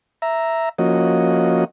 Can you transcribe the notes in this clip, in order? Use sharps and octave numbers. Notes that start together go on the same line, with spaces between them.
E5 A#5
F3 A#3 C#4 F#4 D#5